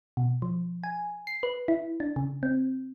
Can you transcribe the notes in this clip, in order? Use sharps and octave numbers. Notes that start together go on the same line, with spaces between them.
B2
F3
G#5
C7
B4
E4
D4
C#3
C4